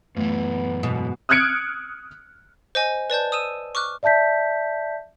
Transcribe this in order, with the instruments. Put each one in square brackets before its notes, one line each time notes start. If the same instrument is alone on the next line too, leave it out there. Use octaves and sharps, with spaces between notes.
[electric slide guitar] F#2 E3 [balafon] A3 [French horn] B3
[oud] G#2 B2
[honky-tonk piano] D#6 F6 F#6 G#6 C#7 D7
[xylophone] C5 D#5 G#5
B4 D5 A5 G6
D#6 E6 D#7 E7
C#6 D6 F6 F#6
[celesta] D5 E5 A5 G6 B6